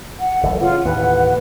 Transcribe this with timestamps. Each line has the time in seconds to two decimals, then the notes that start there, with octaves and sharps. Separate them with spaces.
0.20 F#5
0.43 F#1 D2 E3 A4
0.60 C#3 F4 F#5
0.85 D#2 A2 E3 B4